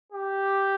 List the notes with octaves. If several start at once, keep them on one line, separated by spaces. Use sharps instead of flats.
G4